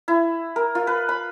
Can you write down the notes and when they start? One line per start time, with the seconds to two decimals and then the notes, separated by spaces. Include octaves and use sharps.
0.08 E4
0.56 A#4
0.75 F4
0.87 B4
1.09 B5